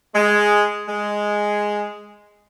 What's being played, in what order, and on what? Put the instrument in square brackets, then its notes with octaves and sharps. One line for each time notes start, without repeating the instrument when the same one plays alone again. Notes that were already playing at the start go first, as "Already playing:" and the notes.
[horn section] G#3
G#3